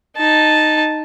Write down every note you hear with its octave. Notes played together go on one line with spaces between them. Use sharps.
D#4 A5